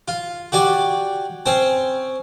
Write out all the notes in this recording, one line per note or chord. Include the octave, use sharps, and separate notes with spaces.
F4
F#4 G4 D5 G#5
C4 C#4 C5